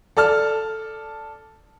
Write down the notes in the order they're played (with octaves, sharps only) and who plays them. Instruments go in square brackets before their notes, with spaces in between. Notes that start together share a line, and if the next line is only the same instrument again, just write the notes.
[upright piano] A4 D5 A5 F6